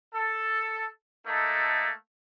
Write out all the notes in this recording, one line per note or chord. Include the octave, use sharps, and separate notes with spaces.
A4
A3 A#3 D#4 A4